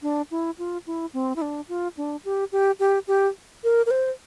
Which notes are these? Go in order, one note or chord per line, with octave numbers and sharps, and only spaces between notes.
D4
E4
F4
E4
C4
E4
D4
F4
D4
G4
G4
G4
G4
A#4
A#4
C5